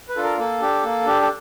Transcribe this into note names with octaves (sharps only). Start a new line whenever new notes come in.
B4
D4 F4 A4
A#4
A#3 A4
D4 G4
A#3
D4 G4
A4